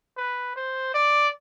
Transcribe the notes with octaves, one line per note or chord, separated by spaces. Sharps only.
B4
C5
D5